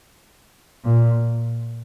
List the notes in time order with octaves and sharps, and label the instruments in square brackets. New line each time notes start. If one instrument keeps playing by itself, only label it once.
[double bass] A#2